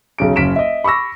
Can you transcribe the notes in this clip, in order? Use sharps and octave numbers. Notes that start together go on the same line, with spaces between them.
B1 C#3 D7
F#1 C#4 B6 D7 E7
D#5 E5
B5 C#6 D6 E6 A#6